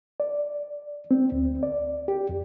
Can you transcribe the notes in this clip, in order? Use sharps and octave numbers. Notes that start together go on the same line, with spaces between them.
D5
C4
D2
D5
G4
F2